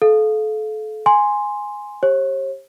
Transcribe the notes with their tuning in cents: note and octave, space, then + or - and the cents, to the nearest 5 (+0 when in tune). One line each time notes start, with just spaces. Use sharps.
A4 -30 F5 +0
G#5 +0 C6 +0
G4 +0 C#5 -45